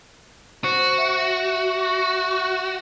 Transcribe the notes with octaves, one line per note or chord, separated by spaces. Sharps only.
F#4 C5
E5